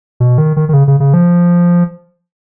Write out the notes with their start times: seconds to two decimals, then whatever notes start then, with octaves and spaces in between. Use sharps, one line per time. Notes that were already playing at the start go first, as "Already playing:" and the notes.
0.20 B2
0.38 D#3
0.57 D#3
0.69 D#3
0.73 C#3
0.88 C#3
1.00 C#3
1.14 F3